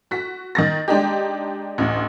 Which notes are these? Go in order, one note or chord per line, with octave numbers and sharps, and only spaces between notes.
F#4 B6
D#3 A6 A#6
G#3 D4 D#4 G4
A1 D2